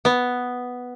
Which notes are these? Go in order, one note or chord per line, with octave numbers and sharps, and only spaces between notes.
B3